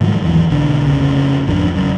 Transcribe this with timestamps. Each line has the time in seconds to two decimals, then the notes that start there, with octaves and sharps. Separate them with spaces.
0.01 G#2 D#3 F3 F#3
0.22 G#1 E2 E3
0.50 B1 D3 D4
0.86 F1 C#3
1.47 G#1 F2 D4
1.76 F#1 F#2